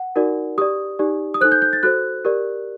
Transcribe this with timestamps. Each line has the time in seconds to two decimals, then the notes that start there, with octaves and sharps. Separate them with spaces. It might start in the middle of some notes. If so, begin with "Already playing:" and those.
Already playing: F#5
0.16 D#4 F#4 A#4 D5
0.58 G4 D5 D#6
0.99 D#4 G4 D5
1.34 D#6
1.41 D#4 A4 C5 F#6
1.52 G6
1.62 G6
1.73 A6
1.83 F#4 A4 C5 F#6
2.25 G4 A#4 D5